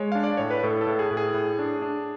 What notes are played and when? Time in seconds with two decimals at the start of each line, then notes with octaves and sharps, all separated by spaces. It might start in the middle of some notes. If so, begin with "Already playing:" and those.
Already playing: G#3 C#5
0.12 D4 F5
0.24 D5
0.37 A2 C#5
0.51 B4
0.63 A2 A4
0.81 A4
0.87 A2
0.99 G#4
1.11 A2
1.17 G#4
1.34 A2
1.59 D4
1.82 D4